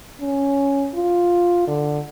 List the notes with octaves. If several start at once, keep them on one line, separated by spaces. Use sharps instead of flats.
C#4
F4
D3